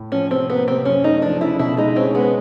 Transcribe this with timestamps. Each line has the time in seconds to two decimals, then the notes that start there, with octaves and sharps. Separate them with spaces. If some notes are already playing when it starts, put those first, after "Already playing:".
Already playing: A2
0.12 F3 C#4
0.31 C3 C4
0.50 A#3 B3
0.68 C3 C4
0.85 F#2 C#4
1.04 A3 D#4
1.22 F3 D4
1.41 C#3 E4
1.59 B2 E4
1.77 G#3 D#4
1.96 C4 C#4
2.15 G#3 B3